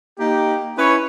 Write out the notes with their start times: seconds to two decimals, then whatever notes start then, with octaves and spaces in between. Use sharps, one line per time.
0.19 A#3 D#4 G4
0.77 C#4 E4 B4 C#5